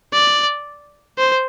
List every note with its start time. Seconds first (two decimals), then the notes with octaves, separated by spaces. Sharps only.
0.13 D5
1.18 C5